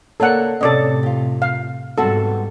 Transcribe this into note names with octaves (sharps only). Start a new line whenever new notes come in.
C#3 A#3 A4 D5 F#5
A2 C3 C#4 A4 D5 D#5
F4 G4
F5
G#2 G3 B3 C4 F#4 A4